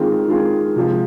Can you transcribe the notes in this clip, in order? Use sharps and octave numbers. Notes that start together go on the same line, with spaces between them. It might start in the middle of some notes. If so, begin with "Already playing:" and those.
Already playing: D#3 G#3 C4 F4 G#4
D#3 G#3 C4 F4 G#4
C3 F3 G#3